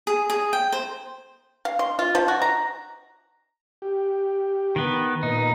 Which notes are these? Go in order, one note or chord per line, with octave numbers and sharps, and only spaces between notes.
G#4
G#4
G5
C5
F5
C6
F4
F3
F#4
A#5
G4
D#3 B3
A#2 D#4 B4 D#5